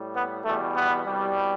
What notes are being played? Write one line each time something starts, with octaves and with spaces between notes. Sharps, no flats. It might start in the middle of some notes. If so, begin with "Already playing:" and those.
Already playing: A2 G3
B3
E2 B2 G3 A3
B3
C2 B2 G3